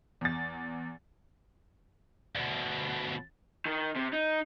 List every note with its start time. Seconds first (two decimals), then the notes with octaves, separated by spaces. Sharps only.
0.21 E2 A6
2.36 D2 B2
3.65 D#3
3.95 C3
4.13 D#4